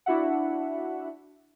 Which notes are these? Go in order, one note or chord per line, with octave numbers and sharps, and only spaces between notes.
D4 E4 F#4 E5 F#5